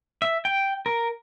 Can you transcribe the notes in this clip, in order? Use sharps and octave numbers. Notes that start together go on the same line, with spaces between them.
E5
G5
A#4